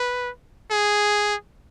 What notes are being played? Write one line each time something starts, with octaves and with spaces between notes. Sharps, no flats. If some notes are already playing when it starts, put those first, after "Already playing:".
Already playing: B4
G#4